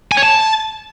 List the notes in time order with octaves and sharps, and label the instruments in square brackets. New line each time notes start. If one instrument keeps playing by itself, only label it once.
[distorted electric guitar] G#5
C#5
A5